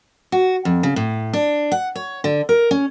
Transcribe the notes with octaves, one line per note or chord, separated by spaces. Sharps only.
F#4
F2
C#3
A2
D4
F#5
C#5
D3
A#4
C#4